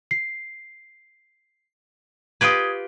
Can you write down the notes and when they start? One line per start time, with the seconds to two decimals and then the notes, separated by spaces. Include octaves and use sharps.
0.11 C7
2.41 F4 G4 B4 D#6 G#6